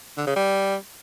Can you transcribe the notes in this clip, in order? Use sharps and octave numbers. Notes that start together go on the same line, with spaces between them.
D3
C#3
G3